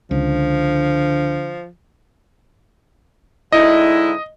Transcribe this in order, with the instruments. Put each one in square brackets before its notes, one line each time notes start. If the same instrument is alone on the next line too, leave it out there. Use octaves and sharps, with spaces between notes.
[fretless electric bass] C#2 [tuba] D3 [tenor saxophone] F3
[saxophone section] G#2 D3 E4 [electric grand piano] D#5